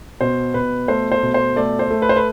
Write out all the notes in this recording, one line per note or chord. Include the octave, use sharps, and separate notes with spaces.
B2 C5
B2 B4
A3 C5
C5
B2
C5
A3 D5
C5
A3
B4
C5
B4